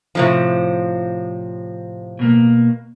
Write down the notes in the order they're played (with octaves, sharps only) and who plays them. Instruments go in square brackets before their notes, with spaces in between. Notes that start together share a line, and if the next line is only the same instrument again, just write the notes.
[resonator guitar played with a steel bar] A2 C3 F3
[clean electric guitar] B2 A#3